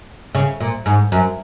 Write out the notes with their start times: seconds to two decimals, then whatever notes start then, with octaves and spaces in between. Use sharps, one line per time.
0.35 C#3
0.60 A#2
0.86 G#2
1.12 F#2